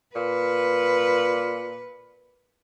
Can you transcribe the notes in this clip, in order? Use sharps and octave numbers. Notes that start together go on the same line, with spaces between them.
A#2 B4